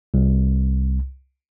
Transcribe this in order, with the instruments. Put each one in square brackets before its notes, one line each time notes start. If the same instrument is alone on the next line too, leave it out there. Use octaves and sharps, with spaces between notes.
[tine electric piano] C2